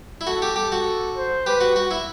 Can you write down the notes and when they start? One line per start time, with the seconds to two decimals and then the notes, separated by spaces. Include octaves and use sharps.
0.21 E4
0.27 F#4 A4
0.42 G4
0.56 G4 A4
0.72 F#4
1.16 C5
1.46 G4 B4
1.60 F#4
1.76 F#4
1.91 E4